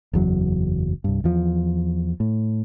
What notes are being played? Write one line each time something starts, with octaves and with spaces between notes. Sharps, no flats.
F#1 E2 F#3
C2 G2
E2 F3
A2